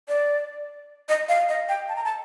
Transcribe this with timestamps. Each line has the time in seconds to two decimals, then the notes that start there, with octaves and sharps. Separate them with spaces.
0.08 D5
1.09 D#5
1.29 F5
1.49 D#5
1.69 G5
1.89 A5
1.96 A#5
2.05 A5